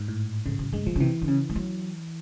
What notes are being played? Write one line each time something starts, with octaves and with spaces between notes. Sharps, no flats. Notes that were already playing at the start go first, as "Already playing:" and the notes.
Already playing: G#2
A2
F2 C#3
F#2
G2 G#3
A#2 F3
C#3
C3 E3
D3
C#3
G3
F#3